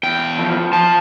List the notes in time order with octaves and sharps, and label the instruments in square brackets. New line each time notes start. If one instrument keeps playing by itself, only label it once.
[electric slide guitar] E2 G5
F3
F3 A5